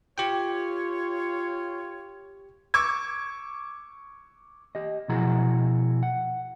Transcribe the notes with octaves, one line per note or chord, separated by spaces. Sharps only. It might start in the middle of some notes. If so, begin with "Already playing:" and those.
F4 G4 C#5 G5
C#6 D6 E6 G#6
G4 D#5
B2 F3 E4 F#4 G#4 A#5
F#5